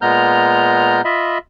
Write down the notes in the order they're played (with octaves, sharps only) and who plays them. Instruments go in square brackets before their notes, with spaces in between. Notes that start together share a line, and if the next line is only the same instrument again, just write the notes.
[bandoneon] A#2 G#3 B3 A#5 F6 G6
F4 D#5 E5 B5